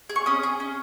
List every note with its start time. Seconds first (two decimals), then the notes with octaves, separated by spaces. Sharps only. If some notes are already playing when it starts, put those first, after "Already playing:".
0.09 G#4
0.16 C#6
0.26 C#4 D#6
0.43 G#4
0.60 C#4